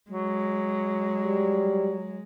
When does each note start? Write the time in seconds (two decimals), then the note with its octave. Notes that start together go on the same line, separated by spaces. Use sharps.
0.11 F#3 G#3
1.24 G3